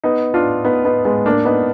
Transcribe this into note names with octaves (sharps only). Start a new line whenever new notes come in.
B3 D#4
D4 F4
B3 D#4
B3 D#4
G#3 B3
A#3 D4
B3 D#4